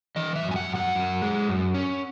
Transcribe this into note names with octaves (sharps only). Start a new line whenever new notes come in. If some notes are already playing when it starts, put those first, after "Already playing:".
E3 D#5
E5
F#2
G#5
F#5
F#2
F#5
F#2
G#3
F#2
C#4